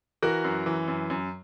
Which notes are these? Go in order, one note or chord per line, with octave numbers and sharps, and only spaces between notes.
E3 F#4 A#4
F#2
E3
F#2
F#2